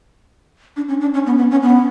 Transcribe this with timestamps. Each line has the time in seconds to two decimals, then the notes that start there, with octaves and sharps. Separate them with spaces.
0.77 D4
0.88 C#4
1.01 D4
1.14 C#4
1.26 B3
1.38 B3
1.51 C#4
1.63 B3